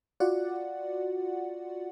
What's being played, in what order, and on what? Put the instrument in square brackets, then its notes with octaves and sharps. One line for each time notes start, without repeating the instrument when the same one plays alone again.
[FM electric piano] F4 F#4 D5 F#5